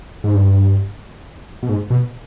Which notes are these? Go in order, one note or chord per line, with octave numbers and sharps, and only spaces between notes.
G#2
G2
B2
G#2
B2